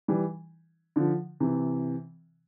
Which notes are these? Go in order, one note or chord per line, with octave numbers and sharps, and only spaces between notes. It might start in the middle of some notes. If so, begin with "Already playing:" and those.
E3 G3
D3 F3
C3 E3